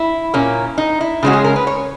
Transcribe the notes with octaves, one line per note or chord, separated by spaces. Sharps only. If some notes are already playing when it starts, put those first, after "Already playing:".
Already playing: E4
A#2 A#3 C#4
D#4
E4
C#3 G#3 C#4 F#4
G#4
A#4
B4
C#5